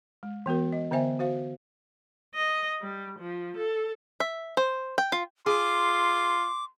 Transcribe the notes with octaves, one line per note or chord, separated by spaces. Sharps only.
G#3
E3 B3 F#4 A#4
D#5
D3 B3 C5 E5 G#5
F#4 C5 F5
D#5
G3
F3
A4
E5
C5
G5
F4
F4 G#4 C6 D6